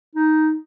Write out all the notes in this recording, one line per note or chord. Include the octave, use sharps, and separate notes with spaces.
D#4